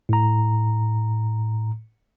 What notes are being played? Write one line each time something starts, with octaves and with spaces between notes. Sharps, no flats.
A2 A#5